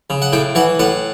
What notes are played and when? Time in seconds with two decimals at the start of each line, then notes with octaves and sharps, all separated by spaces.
0.10 C#3
0.22 F#5
0.33 A2 G5
0.55 E3 F#5
0.79 A2 F#5